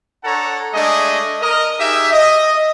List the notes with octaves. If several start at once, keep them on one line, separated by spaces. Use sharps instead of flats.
D4 A4 C#5 F#5 A5 A#5
G#3 A3 D4 G#4 D#5
A#4 D#5
D#4 G4 G#4 E5
D#5